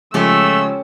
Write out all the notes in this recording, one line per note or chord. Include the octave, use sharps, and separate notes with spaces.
C#3 F3 G#3 A3 C#4 G4 A4 E6